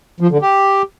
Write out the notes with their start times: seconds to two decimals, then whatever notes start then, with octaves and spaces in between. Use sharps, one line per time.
0.21 F3
0.31 D3
0.42 G4